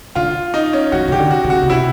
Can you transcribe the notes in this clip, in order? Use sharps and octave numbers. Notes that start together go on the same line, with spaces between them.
D3 F4
D#4
C#4
E3 F#4
C#3 G4
D3
F#4
C#3
F#4
C#3
C3 E4